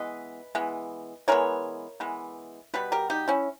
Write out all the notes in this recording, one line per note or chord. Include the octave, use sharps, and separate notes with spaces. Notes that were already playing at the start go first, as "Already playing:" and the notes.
Already playing: E3 G#3 B3 B4 D#5
E3 G#3 B3
E3 G#3 B3 A#4 C#5
E3 G#3 B3
B2 G3 B3 B4
G4 A#4
D#4 G4
C#4 E4